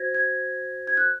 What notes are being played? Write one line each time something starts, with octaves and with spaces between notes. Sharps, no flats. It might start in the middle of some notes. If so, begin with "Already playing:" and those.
Already playing: F#4 C5 G#6 A#6
G#6
G#6
F#6